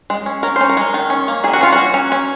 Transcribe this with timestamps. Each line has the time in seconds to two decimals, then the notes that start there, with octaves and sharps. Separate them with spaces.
0.10 G#3
0.26 C#4
0.43 C#4 A#4
0.56 C#4 C5
0.69 A#4
0.77 G#3
0.94 D#3
1.10 C#4
1.28 A#3
1.44 D#3 G#4
1.53 F#4
1.61 C#4 F4
1.72 F#4
1.78 A#3
1.94 C#4
2.12 C#4